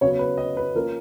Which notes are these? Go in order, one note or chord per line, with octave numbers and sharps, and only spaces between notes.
C#3 F#3 B3 C#5
B4
D#5
B4
F3 A#3 C#4 A#4